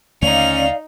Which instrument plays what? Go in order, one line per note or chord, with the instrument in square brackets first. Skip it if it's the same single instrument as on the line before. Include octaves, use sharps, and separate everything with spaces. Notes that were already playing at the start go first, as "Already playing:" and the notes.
[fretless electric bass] D#2 D3 A3 [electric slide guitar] C#4 [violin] D#4 F7 [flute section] D5 F5